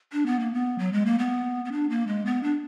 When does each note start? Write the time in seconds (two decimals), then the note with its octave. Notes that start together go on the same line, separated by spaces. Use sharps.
0.12 D4
0.26 B3
0.40 A#3
0.54 B3
0.79 F#3
0.93 G#3
1.06 A#3
1.19 B3
1.65 B3
1.72 D4
1.90 A#3
2.07 G#3
2.26 B3
2.43 D4